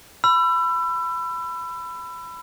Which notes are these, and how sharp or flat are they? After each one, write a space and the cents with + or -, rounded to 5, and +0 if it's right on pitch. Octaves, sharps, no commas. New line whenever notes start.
B5 +15 E6 +30